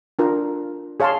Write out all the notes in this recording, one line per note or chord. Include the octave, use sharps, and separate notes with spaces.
D4 F4 A#4
G#4 C#5 F5 A5 C6